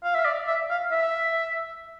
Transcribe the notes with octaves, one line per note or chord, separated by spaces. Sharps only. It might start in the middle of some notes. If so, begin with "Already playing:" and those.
F5
E5
D5
E5
F5
E5